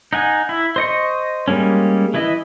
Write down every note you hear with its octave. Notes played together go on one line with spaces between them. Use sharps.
D#4 F#5 G#5
E4
C5 D#5 C#6
G3 G#3 A#3 C#4
E3 E4 B4 D#5